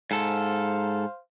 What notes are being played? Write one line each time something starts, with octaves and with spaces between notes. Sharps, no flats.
G#2 A4 C5 F5